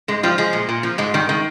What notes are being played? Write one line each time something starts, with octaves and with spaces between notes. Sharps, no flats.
G#2 G#3
F3 G3
F3 G#3
A#2
A#2
F3
G#2 G#3
D#3 G3
D#3 G#3